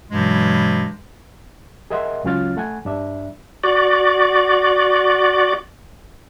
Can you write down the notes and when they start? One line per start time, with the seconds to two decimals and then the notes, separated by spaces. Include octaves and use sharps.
0.11 G2 B2 E3 F#3 G#3
1.90 G#4 A#4 D#5 E5 F#5 C6
2.24 C#2 F#3 C#4 F4 F6 A6
2.57 A3 F#5 G#5
2.85 G2 D4 E5
3.64 F#4 D5